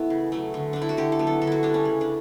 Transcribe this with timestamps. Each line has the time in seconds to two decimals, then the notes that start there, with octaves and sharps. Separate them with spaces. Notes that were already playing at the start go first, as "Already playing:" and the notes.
Already playing: E3 A3 B3 E4
0.10 C#3
0.32 F#3 A3
0.54 D3
0.73 A3 D4
0.82 E4
0.89 F#4
0.97 D3 G4
1.12 A4
1.19 F#3 B3
1.27 A4
1.41 D3 A4
1.47 E4 F#4
1.63 G3 B3 D4
1.74 C#4
1.85 C#3
2.01 D4